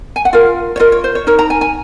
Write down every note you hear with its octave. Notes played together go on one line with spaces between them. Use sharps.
G#5
F#5
F4 A#4 F5
C#5
F4 A#4 D#5
C#5
C5
C#5
D#4 A#4 C#5
A#5
G#5
G#5